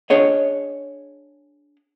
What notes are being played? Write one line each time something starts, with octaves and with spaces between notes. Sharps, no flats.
D4 G#4 C#5 D#5